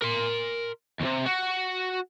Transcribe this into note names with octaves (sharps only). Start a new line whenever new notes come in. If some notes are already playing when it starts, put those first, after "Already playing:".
A#4 C6
D#2 C3
F#4